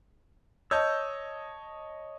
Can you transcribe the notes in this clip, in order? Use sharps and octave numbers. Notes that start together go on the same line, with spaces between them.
C#5 D#5 A5 E6 G6